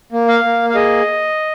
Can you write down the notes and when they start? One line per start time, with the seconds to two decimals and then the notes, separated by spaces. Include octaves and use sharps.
0.12 A#3
0.28 F5
0.44 A#3
0.70 F5
0.75 G#4 D#5